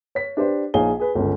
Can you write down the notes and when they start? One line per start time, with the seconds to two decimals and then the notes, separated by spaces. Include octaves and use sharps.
0.15 C#5 B6
0.37 D4 G4 B4 C5 D5
0.74 A#1 D#4 G#4 C#5 F5 G7
1.00 G#4 B4
1.15 G1 C#2 C#4